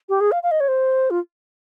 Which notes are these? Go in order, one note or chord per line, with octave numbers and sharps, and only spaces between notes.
G4
G#4
F5
F5
D#5
C#5
C5
F4